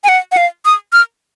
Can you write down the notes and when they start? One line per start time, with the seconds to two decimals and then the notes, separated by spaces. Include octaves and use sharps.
0.04 G#5
0.09 F#5
0.32 F#5
0.37 F5
0.65 D#6
0.93 F6